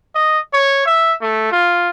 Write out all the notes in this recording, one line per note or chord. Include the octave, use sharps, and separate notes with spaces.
D#5
C#5
E5
A3
F4